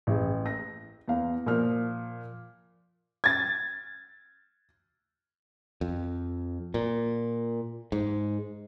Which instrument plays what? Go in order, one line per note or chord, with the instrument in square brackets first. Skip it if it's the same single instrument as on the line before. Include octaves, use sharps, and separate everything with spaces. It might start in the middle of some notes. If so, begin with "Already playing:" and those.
[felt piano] A1 G#4
A#6
E2 F5
A#2 F3 F6
[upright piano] G#6 A6
[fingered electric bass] F2
A#2
G#2